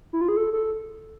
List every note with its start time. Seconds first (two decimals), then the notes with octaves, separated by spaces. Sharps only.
0.13 E4
0.21 F4
0.29 G#4
0.37 A4
0.53 A4